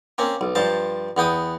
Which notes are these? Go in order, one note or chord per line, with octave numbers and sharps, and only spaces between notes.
A#3 C4 C#4
B1
G2 F3 C5 A5
E2 B3 G5 D#6